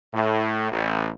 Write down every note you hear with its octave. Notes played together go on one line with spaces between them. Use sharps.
A2
A1